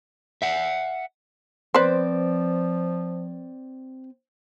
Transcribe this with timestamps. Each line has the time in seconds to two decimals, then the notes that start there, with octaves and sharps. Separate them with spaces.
0.42 E5 F#5
1.74 F3 C4 B4 C5 D5